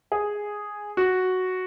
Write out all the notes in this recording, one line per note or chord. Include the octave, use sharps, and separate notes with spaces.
G#4
F#4